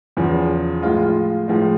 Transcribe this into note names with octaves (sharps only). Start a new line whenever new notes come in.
E2 C#3 F3
A2 F3 G#3 F4
F4
A2 F3 G#3